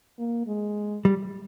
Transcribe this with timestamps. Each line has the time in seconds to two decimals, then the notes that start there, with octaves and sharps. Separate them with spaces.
0.18 A#3
0.47 G#3
1.05 G3